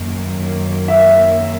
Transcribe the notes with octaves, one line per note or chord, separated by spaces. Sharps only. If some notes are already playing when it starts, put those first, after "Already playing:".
Already playing: F#2 D#3 F#3 A#3
E5